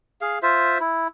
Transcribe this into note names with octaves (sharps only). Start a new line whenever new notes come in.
G#4 F5
F4 C5 E5
E4